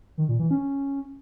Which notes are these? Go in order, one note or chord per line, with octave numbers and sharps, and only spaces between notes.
D#3
A#2
E3
C#4